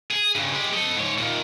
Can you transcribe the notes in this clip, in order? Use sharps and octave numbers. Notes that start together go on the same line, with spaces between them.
G#4
G2 C#3
G#3 G4
A4 D#5
G#2 C#5
A#2 D#3